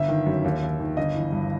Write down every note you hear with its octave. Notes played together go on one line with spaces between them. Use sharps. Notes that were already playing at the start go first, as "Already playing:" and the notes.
Already playing: G1 E5
D#3
F#2
D#2
D#2
D#3
G1 D#5
E3
G2